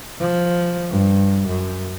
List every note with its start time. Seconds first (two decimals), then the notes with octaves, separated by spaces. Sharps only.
0.20 F3
0.91 G2
1.47 F#2